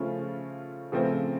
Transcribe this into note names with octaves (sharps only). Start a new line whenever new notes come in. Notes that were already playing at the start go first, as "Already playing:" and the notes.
Already playing: C#3 F3 A3 C#4 F4
C#3 F3 A3 C4